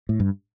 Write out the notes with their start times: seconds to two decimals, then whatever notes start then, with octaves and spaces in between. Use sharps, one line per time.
0.09 A2
0.20 G2